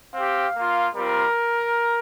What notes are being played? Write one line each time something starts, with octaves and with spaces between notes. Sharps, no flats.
C4 G4 F5
A#3 F4
G3 C4 F4 A#4